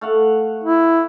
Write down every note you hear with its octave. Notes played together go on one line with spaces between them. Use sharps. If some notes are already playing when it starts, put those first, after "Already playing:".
A3 F5 F#5
E4